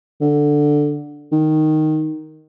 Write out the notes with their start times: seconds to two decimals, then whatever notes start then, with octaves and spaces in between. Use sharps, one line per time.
0.21 D3
1.32 D#3